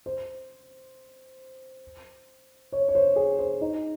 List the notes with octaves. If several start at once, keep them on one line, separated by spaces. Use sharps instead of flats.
C5
C#5
C#5
C5
G#4
C5
D#4